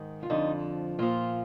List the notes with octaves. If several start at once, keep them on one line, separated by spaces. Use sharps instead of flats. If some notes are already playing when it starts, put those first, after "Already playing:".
Already playing: G#2 D#3
F4
F2 D3 F3 D#4
A#2 F3 F4